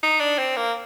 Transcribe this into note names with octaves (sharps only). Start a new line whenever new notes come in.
D#4
D4
C4
A#3